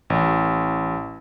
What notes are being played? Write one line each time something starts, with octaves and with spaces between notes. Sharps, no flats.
A1